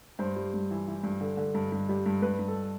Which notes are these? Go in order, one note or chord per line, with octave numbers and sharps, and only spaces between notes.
G2 C5
G3
G2
E3
E3
G2
D3
D3
G2
G2
G3
G2
G2 B4
G2
A4